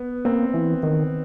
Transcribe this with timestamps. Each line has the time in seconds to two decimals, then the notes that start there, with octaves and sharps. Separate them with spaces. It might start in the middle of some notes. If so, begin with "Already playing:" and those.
Already playing: B3
0.25 A#3 C4
0.54 E3
0.83 D#3